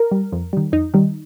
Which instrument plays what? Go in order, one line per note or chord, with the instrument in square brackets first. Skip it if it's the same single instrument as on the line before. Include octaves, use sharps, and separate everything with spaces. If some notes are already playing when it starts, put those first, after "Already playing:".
Already playing: [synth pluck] A#4
G3
F2
D#3 G3
F2 D#4
D#3 G3